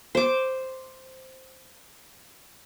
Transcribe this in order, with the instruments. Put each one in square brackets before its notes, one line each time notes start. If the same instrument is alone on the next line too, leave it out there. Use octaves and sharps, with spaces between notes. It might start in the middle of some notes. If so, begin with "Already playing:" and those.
[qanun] C5 D6